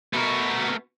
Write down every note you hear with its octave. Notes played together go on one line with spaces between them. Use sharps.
A3 B3 F#4 A#4